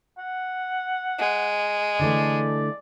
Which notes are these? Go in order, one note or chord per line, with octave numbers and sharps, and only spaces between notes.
F#5
G#3
D3 E3 A3 D5